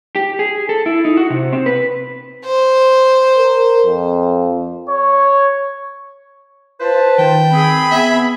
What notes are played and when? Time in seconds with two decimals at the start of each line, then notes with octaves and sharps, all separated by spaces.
0.16 G4
0.39 G#4
0.69 A4
0.86 E4
1.05 D#4
1.17 F#4
1.30 C3
1.53 C4
1.66 B4
2.45 C5
3.37 A#4
3.86 F2
4.89 C#5
6.81 F4 B4 C5 A5
7.18 D#3 G5
7.53 C4 G#4 B5
7.91 B3 E5